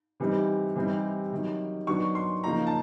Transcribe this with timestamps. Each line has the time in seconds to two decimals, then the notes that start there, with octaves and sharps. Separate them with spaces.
0.20 C3 E3 G3 C4 D#4
0.76 C3 E3 G3 C4 D#4
1.32 C3 D#3 F#3
1.87 D#3 F#3 B3 D4 C#6
2.15 C6
2.44 C#3 F3 A#3 D#4 A#5
2.67 A5